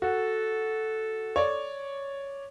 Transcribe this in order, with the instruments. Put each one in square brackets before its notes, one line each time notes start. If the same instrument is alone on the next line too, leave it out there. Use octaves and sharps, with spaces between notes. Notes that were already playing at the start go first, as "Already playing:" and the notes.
[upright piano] F#4 [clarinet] A4
[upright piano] C#5 D5